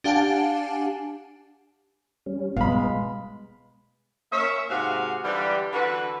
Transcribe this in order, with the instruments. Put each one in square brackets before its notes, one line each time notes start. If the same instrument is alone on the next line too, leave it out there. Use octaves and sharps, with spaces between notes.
[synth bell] D4 G4 F5 F#5 G#5 A5
[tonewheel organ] G3 C#4
[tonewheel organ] B2 B3 [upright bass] G3 [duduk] G#3 [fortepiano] F5 B5
[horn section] A#3 C#4 E5
G#2 C3 F#4 G#4 F5
D3 E3 G3
D3 E3 F#4 B4